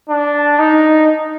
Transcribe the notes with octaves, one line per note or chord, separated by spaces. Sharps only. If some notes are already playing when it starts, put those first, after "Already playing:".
D4
D#4